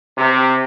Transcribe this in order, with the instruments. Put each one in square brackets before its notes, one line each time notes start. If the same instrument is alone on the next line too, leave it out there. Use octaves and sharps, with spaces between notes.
[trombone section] C3